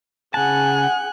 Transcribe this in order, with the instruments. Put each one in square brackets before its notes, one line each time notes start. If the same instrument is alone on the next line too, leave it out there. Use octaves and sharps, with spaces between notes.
[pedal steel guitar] C#3 A5 [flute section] G#4 F#5 [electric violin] G#5 F#6